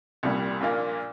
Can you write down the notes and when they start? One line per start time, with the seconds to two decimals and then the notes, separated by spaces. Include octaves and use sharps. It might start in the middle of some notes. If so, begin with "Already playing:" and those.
0.23 C2 A#2 G3
0.61 A#1 A#2 A#3